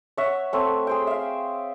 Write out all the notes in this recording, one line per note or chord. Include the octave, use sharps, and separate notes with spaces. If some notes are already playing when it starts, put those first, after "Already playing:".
C#5 E5 F#5
A3 C4 C#5
G#4 C5 G5
E5 F5